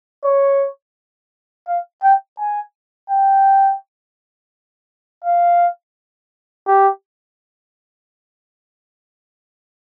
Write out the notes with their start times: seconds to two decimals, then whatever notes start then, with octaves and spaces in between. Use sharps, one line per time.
0.25 C#5
1.68 F5
2.03 G5
2.39 G#5
3.10 G5
5.25 F5
6.67 G4